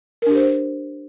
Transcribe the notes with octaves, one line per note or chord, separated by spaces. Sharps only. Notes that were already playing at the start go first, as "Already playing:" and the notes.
D4 G4 A#4 C5